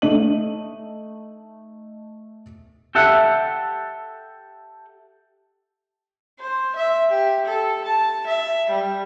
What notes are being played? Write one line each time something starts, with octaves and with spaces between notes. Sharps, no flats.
A3 D#4 D#5 D#7 F#7
G4 A4 E5 F#5
C5
E5
G4
A4
A5
E5
G3